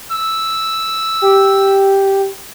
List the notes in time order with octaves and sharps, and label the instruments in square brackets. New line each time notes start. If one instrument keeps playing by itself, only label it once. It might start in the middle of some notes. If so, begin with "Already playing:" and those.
[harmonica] E6
[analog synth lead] G4